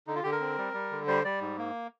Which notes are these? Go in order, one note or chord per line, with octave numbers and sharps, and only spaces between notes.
D3 D#4
F4
D3 G4
A#4
C4
G3
G3
D3
G3 C5
G3 D5
G#2
A#3